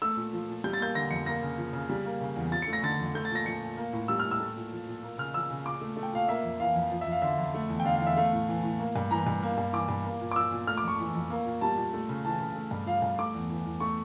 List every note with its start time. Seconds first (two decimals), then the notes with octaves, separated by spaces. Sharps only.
0.02 A3 E6
0.17 A#2
0.33 F3
0.48 A#2
0.64 G3 G6
0.73 A6
0.80 A#3 G6
0.95 D3 A#6
1.11 F2 C#7
1.26 A#3 A#6
1.42 C#3
1.58 F3
1.73 C#3
1.89 G3
2.05 A#3
2.20 C#3
2.36 E2
2.52 F3 A6
2.62 C#7
2.68 A3
2.73 A#6
2.83 D3 A6
3.00 F2
3.15 A3 G6
3.25 A6
3.31 A#2 A#6
3.46 F3 C#7
3.62 A#2
3.77 A#3
3.93 A2
4.08 G3 E6
4.20 F6
4.25 A2
4.31 E6
4.40 A3
4.56 A#2
4.72 F3
4.87 A#2
5.03 A#3
5.18 C#3 F6
5.34 F3 E6
5.50 C#3
5.66 A#2 D6
5.81 A3
5.96 A3
6.03 G5
6.12 A#2 F5
6.29 A#3 E5
6.44 F2
6.60 E3 F5
6.75 F2
6.91 F3
7.01 E5
7.07 F2
7.12 F5
7.22 D3 E5
7.38 F2
7.54 A3
7.69 E2
7.80 G5
7.85 D3 F5
7.95 F5
8.00 E2
8.07 E5
8.17 A3 F5
8.33 A2
8.49 E3
8.63 A2
8.79 A#3
8.96 G2
9.11 E3 A#5
9.27 G2
9.43 A#3
9.58 G2
9.73 E3 D6
9.89 G2
10.04 A#3
10.21 A#2
10.31 D6
10.36 F3 E6
10.52 A#2
10.67 A3 F6
10.77 D6
10.83 F2 C#6
10.99 E3
11.14 F2
11.30 A#3
11.45 A#2
11.61 G3 A5
11.77 A#2
11.93 A3
12.09 C#3
12.25 E3 A5
12.40 C#3
12.55 A3
12.71 G2
12.86 F3 F5
13.02 G2
13.19 A3 D6
13.35 E2
13.50 E3
13.66 E2
13.80 A3 C#6